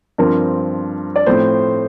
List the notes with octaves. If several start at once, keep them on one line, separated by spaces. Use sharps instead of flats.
G2 F3 C4 A#4
D5
A2 F3 C4 C5